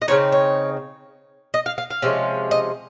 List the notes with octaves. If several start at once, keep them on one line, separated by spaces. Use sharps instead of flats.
D#5
C#3 F3 C4 D#4 C#5
C#5
D#5
F5
F5
F5
C3 F3 G#3 C#4
D#5